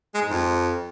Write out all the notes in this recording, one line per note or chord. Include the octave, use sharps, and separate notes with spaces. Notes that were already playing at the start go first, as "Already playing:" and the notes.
G#3
G#2
F2